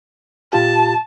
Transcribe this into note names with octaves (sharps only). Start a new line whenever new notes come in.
A#2 F4 G4 A5